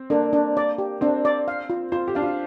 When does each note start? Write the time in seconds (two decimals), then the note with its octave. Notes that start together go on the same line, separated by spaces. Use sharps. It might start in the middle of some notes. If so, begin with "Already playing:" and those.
Already playing: C4
0.10 A#3 D4
0.33 D4
0.57 D5
0.78 G4
1.01 C4 D4
1.25 D5
1.48 F5
1.70 F4
1.92 F4 C5
2.08 G4
2.15 D4 F5
2.22 F4